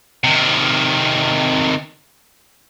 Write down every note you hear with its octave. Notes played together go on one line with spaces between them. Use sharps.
C3 D#3